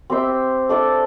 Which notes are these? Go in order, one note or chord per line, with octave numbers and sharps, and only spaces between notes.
C4 G4 C5 E5
A3 D4 A4 D5